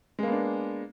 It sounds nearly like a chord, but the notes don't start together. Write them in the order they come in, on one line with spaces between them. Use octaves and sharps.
G#3 A#3 B3 D4